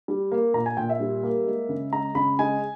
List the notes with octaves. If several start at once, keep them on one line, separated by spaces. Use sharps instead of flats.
G3
A#3
A#2 A#5
G#5
A#2 G5
E5
G3
A#3
G#3
C#3
G#3 A#5
C#3 B5
G#3 G#5